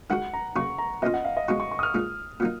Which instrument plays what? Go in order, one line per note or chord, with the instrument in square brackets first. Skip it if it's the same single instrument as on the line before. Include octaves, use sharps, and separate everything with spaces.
[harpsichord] D#3 G#3 D#4 F#4 [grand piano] F#5
[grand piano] A#5
[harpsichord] C#3 F#3 A#3 D#4 [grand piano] C#6
[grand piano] A#5
[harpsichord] B2 A#3 C#4 F4 [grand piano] D#5
[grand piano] F#5
F5
D#5
[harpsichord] B2 G#3 D#4 F#4 [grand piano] C#6
[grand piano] C#6
C#6
D#6
F6
[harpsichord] A#2 G#3 D#4
A#2 F#3 A#3 D#4